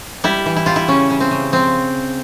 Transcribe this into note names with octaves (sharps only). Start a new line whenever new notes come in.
G3 E4
E3
E4
G3 F4
E4
C#3 C#4
C#3
C4
C#3
F3 C4